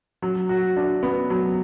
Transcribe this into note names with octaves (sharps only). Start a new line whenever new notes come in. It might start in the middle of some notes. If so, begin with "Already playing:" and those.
F#3
F#4
D4
B3
F#3